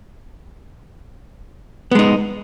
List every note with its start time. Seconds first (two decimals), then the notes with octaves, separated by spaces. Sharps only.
1.91 B3
1.95 G#3
1.99 D#4